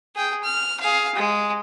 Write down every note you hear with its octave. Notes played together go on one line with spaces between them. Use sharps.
G#4 G5
F6
G#4 F5
G#3